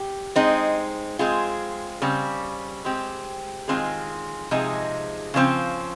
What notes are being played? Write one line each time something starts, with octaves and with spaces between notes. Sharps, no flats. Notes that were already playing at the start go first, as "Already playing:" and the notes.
Already playing: G4
G#3 C4 D#4
G#3 C4 F4 G#4
C#3 G3 C4
G#3 C4 G4
D#3 G#3 C4 F4 G#4
C3 F3 G#3 D#4 G#4
C#3 F3 C4